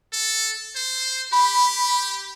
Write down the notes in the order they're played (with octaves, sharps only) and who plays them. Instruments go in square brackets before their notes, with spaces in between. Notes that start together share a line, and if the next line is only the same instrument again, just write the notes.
[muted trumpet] A4
C5
[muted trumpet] G4 [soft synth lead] B5